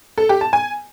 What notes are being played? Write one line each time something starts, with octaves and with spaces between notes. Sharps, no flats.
A4
G4
A5
G#5